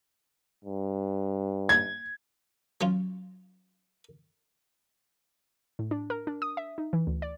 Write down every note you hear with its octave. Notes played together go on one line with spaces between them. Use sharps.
G2
G#6
F#3 C#4 F4
A2
D4
A#4
D4
D#6
E5
D#4
E3
D2
D5